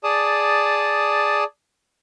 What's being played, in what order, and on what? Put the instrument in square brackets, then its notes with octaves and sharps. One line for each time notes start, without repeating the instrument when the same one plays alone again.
[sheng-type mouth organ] G#4 D5 A5 D#6